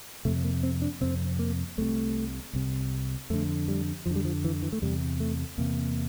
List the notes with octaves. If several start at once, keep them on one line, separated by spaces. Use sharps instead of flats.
F2 C3 A3
A#3
C4
D4
F2 C3 C4
A#3
C2 C3 A3
C2 C3
F2 D3 A3
G3
F2 D3 F3
G3
F3
E3
E3
A3
E2 C3 G3
A3
E2 C3 A#3